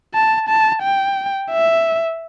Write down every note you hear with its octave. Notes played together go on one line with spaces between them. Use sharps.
A5
A5
G5
E5